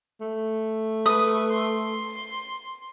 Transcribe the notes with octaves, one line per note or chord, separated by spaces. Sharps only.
A3
B4 D#6
C6